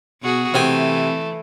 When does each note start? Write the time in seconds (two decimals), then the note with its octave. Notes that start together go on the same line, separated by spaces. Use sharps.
0.22 B2 F#4 G#4
0.54 C3 E3 A3 G5 G#5